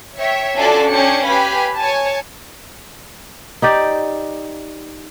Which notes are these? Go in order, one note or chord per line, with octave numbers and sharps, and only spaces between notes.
C#5 E5 G5
C#4 D4 F4 F#4 A4 D5
C#4 D4 C#5 G5 C#7
G4 B4 F5 G#5 B5
C#5 G#5 A5
D#4 G4 D5